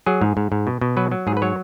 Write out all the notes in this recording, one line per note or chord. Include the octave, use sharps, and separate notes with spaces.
F#3 G#4
G#2
G#2
G#2
B2
B2
F#3 B4
F#3
G#2 G#4
B4
F#3 C#5